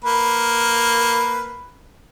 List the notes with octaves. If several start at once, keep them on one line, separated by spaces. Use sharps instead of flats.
A#3 B4